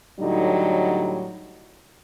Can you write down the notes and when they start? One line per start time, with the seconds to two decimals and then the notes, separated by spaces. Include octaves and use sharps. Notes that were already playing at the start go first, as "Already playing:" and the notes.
0.19 A2 D3 F#3 G3 D#4